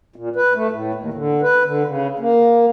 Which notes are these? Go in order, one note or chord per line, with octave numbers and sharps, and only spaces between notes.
A#2
B4
A3
A2
D#2
D3
B4
D3
C#3
A#3